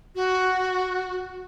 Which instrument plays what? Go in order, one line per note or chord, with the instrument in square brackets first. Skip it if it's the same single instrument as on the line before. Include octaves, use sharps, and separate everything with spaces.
[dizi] F#4